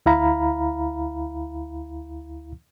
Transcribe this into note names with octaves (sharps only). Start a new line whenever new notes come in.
D2 E4 F5 A#5 B5